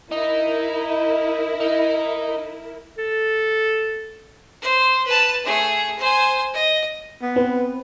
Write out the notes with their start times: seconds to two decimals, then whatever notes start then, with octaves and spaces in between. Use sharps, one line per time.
0.12 D#4 E4 A#4
1.60 D#4
2.98 A4
4.62 C5
5.06 B4 A5
5.45 A3 G#4
5.99 C5 G#5
6.54 D#5
7.22 B3
7.36 C4 B4